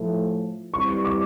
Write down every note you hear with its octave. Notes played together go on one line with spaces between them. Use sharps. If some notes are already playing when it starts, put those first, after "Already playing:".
Already playing: A2 F3 A3
E3 G3 C4 C#6
D6